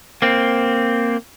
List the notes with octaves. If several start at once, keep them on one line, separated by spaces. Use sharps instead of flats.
A#3 C4